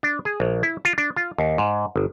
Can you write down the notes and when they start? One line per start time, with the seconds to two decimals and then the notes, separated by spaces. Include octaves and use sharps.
0.03 D4
0.25 G#4
0.40 A#1
0.63 E4
0.85 F4
0.98 D4
1.16 F4
1.38 D#2
1.58 G#2
1.96 G1